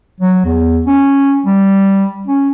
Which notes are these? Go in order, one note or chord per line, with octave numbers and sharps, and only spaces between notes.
F#3
E2
C#4
G3
C#4